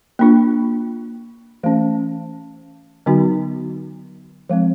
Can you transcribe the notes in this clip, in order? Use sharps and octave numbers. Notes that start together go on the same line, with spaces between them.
A#3 D4 F4
E3 A3 C#4
D3 F#3 B3 D#4 F#4
F3 G#3 C4